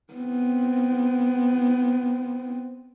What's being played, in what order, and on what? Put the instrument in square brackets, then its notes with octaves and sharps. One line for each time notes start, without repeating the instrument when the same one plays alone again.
[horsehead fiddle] B3 C4